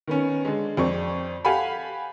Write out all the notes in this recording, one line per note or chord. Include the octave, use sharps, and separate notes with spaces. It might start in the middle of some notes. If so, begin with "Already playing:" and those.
D#3 B3 C#4
D3 G#3
F2 C4 D5 C#6
G4 A4 F5 F#5 G#5 B5